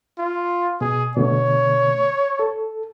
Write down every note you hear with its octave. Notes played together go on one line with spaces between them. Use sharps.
F4
B2 G#4
B2 D3 A3 C#5
A4